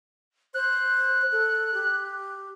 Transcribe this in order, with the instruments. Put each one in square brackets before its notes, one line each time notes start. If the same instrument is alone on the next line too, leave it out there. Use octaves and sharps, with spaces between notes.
[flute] C5 [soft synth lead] F#6
[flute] A4
G4